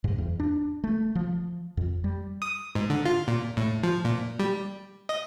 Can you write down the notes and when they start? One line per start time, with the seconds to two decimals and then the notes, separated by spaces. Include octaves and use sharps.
0.04 G2
0.18 E2
0.40 D4
0.84 A3
1.15 F3
1.77 F2
2.04 G3
2.42 D#6
2.75 G#2
2.90 D3
3.05 F4
3.28 A#2
3.57 A2
3.83 F3
4.05 A#2
4.39 G3
5.09 D#5